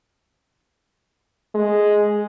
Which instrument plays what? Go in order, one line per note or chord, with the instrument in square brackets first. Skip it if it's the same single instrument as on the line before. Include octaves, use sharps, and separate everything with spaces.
[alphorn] G#3